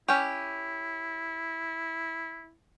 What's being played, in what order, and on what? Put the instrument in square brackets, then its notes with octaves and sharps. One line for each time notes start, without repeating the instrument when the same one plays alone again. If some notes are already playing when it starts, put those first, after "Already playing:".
[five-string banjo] C#4 G4 [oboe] E4